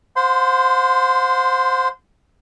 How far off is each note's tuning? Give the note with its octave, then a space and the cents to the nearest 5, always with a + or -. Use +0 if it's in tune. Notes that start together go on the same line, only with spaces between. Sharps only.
C5 +0 F#5 -45 C6 -25